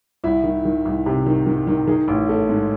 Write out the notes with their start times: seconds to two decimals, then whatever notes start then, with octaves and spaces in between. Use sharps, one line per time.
0.24 C2 E4
0.44 D#3
0.65 D#3
0.85 C2
1.06 C3
1.26 D#3
1.46 D#3
1.67 D#3
1.87 D#3 G#4
2.08 A1
2.29 A3
2.49 G#2